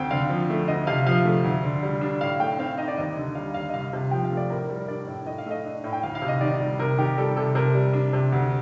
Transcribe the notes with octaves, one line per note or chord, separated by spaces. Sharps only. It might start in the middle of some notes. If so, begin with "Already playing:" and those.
Already playing: D2 C4 G5
D3 F5
F3
A3
D2 D#5
C3 F5
F3 F5
A3
D2
D3
G3
D4
A2 F5
A3 G5
C4 F5
D#4 D#5
D5
D#2 D#5
D3
G3 F5
D#2 F5
D#5
C2 F5
C3
F3 G5
F5
A3
D5
A2 A#4
A#4
G3
A#4
D4 D5
A2
A2 D#5
F5
A3 D#5
D4
A2
G5
D2 F5
F5
C3
D#5
D#3 D5
G3
C3 A#4
D#3 G4
G3 A4
C3 A4
C3 A#4
G3
D4
C3
D2